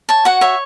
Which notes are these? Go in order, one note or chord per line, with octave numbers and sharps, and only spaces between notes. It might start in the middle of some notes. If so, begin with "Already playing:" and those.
C#5 A5
F#4 F#5
C#5 E5